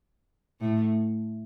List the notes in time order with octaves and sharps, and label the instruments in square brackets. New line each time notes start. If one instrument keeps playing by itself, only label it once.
[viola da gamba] A2 A3